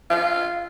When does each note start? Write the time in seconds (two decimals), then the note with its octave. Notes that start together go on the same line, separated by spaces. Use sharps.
0.10 F4